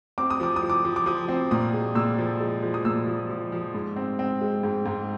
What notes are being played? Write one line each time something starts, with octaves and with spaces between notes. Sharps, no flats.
C4 D6
D#6
F3 D6
D#6
F3
D6
F3
D6
F3 D#6
C4
A#2 D#6
G#3
A#2 E6
F3
G#3
F3
D#6
A#2 E6
F3
F3
F3
G#2
C4
C4
G#3
G#2
G#2